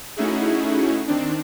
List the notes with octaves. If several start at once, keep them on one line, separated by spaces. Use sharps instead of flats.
A3 C#4 D#4 E4 F#4 G#4
D#3 C4 D4